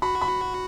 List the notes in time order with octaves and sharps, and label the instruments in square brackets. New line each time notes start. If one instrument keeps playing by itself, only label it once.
[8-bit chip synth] F#4 [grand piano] B5
[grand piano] B5